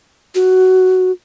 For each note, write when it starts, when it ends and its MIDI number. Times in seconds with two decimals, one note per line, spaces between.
0.35 1.12 66